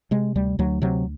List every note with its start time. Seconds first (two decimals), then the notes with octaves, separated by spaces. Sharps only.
0.11 C3 G#3
0.35 D2 G3
0.59 D2 F#3
0.82 C3 F#3